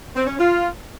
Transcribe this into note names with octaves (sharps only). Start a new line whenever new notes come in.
C4
C#4
F4